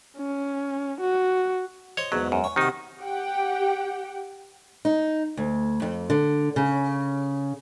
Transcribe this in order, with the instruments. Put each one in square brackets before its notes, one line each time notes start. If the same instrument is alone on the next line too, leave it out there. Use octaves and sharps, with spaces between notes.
[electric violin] C#4
F#4
[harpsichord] C5 D#5 [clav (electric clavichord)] C#5
[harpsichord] E2 G#2 B2 [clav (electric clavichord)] F#3
[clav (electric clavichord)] F#2
[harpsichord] C#5
[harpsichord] C3 F#4 [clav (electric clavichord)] D#3 D#4
[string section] G4 F#5 G5
[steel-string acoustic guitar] D#4
D2
F2
D3
C#3